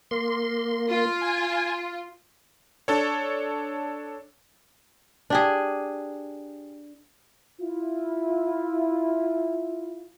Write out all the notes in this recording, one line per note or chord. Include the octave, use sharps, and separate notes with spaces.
A#3 C6
F4
G#5
D4 A4 C#5
D4 G4 G#4
E4 F4